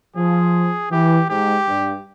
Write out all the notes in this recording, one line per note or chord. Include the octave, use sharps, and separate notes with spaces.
F3 G#4
E3 G4
G#2 G4
G2